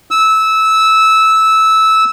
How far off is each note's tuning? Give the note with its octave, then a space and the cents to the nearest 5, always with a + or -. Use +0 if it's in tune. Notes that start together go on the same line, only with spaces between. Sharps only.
E6 -15